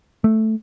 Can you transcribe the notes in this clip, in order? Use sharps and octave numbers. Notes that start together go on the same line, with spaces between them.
A3